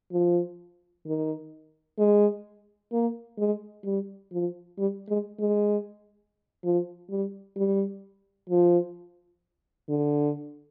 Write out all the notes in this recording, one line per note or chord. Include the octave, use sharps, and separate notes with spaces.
F3
D#3
G#3
A#3
G#3
G3
F3
G3
G#3
G#3
F3
G3
G3
F3
D3